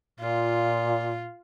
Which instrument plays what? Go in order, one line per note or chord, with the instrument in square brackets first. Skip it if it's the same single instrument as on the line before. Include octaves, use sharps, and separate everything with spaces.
[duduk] A#2 [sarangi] F4